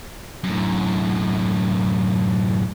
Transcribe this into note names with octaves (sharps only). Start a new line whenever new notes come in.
F#2 A2